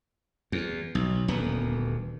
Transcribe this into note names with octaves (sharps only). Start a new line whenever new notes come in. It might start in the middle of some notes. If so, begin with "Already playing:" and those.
E2
B1
D#1 D2 B3